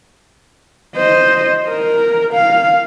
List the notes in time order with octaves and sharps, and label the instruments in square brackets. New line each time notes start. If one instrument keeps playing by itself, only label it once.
[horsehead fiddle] C5 D#5
A#4
F5